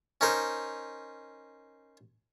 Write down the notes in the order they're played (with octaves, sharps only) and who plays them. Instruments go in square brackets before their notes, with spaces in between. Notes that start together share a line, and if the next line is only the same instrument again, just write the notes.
[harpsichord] C#4 D#4 A#4 C5